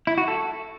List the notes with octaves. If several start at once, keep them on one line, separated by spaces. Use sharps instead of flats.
E4
F#4
A4